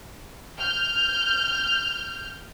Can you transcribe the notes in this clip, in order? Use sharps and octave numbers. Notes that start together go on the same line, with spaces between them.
F6 G6